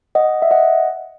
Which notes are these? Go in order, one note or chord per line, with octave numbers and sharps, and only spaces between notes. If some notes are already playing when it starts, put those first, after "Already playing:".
D#5 F#5
E5
D#5 F#5